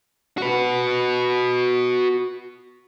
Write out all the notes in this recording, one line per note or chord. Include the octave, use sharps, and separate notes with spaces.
F#4 B4